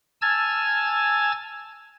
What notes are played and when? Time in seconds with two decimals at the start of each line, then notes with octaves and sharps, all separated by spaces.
0.22 G#5 A5 E6 F6 G#6 A6